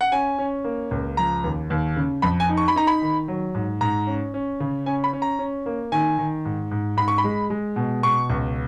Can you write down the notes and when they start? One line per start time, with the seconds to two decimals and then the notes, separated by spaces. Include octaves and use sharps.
0.01 F#5
0.12 C#4 G#5
0.39 C#4
0.64 A#3
0.91 C#2
1.17 F3 A#5
1.44 D#2
1.70 D#2
1.96 C#3
2.22 F2 B5
2.40 G#5
2.49 D#4
2.57 C#6
2.68 B5
2.76 D#4 A#5
2.87 B5
3.02 D#3
3.28 F#3
3.55 G#2
3.81 G#2 A#5
4.07 C#4
4.34 C#4
4.60 C#3
4.86 C#4 G#5
5.04 B5
5.13 C#4
5.22 A#5
5.39 C#4
5.66 A#3
5.92 D#3 G#5
6.18 D#3
6.45 G#2
6.71 G#2
6.97 G#2 B5
7.08 C#6
7.18 B5
7.24 G#3
7.50 G#3
7.76 B2
8.03 B2 C#6
8.30 C#2